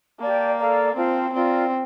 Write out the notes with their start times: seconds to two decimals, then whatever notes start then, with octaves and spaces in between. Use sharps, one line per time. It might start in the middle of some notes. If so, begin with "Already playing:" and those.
0.20 A#3 G4 D5 A5
0.58 A4 D5 F5 A#5
0.95 C4 F4 C5 F5 A5
1.33 C4 F4 A#4 D5